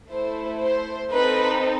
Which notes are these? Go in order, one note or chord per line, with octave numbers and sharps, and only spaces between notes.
A3 E4 A4 C5
C5
C4 D#4 A4 B4